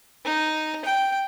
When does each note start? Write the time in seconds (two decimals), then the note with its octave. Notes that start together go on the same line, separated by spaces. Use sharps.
0.25 D#4
0.85 G5